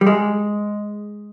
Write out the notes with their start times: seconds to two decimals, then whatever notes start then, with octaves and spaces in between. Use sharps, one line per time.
0.01 G3
0.07 G#3